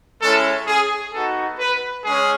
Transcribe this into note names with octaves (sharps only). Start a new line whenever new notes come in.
G#3 C#4 E4 A4
G#4
B3 D#4 F#4 A4
B4
G#3 C#4 G#4